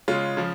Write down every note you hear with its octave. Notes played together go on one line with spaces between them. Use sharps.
C#3 G#3 C#4 F4
C#3 F3